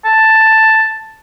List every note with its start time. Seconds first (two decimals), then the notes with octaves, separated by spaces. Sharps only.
0.05 A5